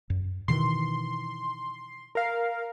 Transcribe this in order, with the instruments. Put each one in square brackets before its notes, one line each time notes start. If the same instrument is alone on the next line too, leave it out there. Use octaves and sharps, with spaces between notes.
[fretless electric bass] F#2
[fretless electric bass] B2 D#3 E3 [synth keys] C6
[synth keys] A#4 F5